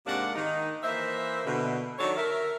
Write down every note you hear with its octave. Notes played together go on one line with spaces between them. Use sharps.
G#2 C3 A#3 D4 D5 F#5
D#3 D#4
E3 A#3 C5 E5
B2 D3
D#3 F#3 D4 A4 C#5
A#4 E5